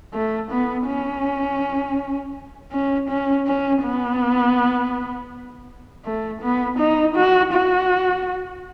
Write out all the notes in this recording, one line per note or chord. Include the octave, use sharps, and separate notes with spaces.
A3
B3
C#4
C#4
C#4
C#4
B3
A3
B3
D#4
F#4
F#4